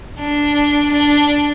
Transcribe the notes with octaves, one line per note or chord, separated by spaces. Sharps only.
D4
D4